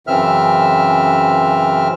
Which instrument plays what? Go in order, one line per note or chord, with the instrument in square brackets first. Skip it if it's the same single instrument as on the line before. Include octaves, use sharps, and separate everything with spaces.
[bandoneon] F#2 C#3 E3 C4 E5 F6